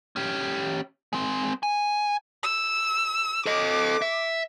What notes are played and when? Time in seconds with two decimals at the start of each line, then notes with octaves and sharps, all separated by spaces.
0.16 C#4 G4
1.13 G#3 C4
1.63 G#5
2.43 E6
3.46 A4 D#5 D6
4.02 E5